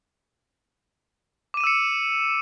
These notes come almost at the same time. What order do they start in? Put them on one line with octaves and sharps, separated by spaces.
D6 D#7 E7 E6 C#7